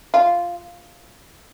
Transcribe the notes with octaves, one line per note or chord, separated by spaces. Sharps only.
F4